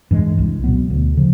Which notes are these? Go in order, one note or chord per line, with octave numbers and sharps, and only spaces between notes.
G2 E3 G#3
C2
B2 F#3 B3
D2
C#3 F3